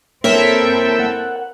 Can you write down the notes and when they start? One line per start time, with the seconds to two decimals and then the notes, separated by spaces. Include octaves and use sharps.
0.24 A#3 C4 E4 A4 A#4 C#5 E5 G5
1.00 F#5